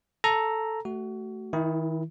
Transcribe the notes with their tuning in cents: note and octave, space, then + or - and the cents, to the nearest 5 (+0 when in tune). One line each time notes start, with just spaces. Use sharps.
A4 +0 A#5 +0
A3 +0 F#4 +25
D#3 +40 E4 +0